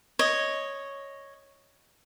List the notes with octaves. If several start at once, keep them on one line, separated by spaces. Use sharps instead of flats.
C#5 D#5